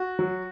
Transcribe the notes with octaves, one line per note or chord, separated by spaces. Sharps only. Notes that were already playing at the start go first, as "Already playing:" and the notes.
Already playing: F#4
F#3